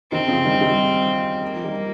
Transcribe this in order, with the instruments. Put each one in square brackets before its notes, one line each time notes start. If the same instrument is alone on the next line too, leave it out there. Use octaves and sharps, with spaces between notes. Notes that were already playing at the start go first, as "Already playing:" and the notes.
[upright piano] C3 D#3 [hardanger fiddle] C4
[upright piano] C#3 F3
D#3 G3
D#3 G3
[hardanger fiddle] A#3
[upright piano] F3
D#3 G3